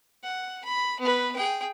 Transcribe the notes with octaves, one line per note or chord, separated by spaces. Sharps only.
F#5
B5
B3 B4
G#4 G5